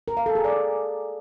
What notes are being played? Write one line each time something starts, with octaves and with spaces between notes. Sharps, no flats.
A#4
F5
A4
G#4
D5